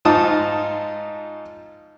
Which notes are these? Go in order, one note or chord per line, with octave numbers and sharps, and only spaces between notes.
G#2 D#4 F4 A5 D#6